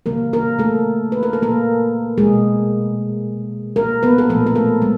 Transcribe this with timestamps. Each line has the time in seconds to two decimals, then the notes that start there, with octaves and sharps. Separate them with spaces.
0.06 C#3 E3 G3 A#3 A#4
0.33 A#3 A#4
0.59 A3 A4
1.12 B4
1.23 A#4
1.33 A4
1.42 A#3 A#4
2.18 B2 G#3 G#4
3.76 A#3 A#4
4.03 B3 B4
4.18 A4
4.29 A#2 F3 A3 A#3 A#4
4.46 A#4
4.55 A3 A4
4.82 G#3